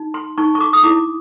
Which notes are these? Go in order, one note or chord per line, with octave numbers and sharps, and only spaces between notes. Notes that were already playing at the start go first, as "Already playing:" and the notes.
Already playing: D#4
C6
D#4 C#6
C#6
D6
D#6
E4 D6